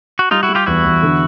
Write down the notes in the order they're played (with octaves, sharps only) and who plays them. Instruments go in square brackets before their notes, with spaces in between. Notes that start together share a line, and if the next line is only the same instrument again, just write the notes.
[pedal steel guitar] F#4
[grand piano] G3 [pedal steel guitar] D#4 F4
[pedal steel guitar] E4 F#4
[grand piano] G3
[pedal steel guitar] F4 G4
[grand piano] E2 [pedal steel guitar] E4 F#4
[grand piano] E2
D3